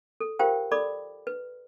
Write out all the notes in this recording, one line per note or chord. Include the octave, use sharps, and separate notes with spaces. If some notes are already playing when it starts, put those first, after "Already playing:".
A4
F4 G4 A#4 C5 F5 G5
A4 D5 B5 D6
B4